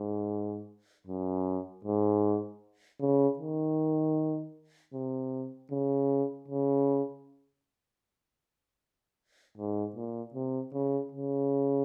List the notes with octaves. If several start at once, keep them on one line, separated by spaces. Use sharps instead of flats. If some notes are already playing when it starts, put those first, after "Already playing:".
Already playing: G#2
F#2
G#2
C#3
D#3
C3
C#3
C#3
G#2
A#2
C3
C#3
C#3